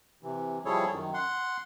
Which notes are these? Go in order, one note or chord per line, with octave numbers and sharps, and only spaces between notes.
C3 E3
F3 G3 E4 G#4 A4 C#5
F#2 D#3
F#5 C6